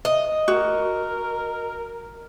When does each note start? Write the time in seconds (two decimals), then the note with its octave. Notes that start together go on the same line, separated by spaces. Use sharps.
0.05 D#5
0.48 F#4 A#4